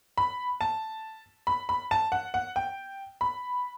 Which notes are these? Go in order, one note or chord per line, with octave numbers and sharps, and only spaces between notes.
B5
A5
B5
B5
A5
F#5
F#5
G5
B5